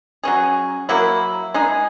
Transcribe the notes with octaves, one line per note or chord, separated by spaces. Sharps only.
F#3 C#4 G#4
F#3 A#3 E4
G#3 D#4 G#4